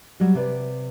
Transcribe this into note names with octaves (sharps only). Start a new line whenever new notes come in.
F#3 G3 F#4
C3 B4 D5